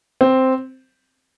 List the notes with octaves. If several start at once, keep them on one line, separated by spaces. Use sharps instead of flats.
C4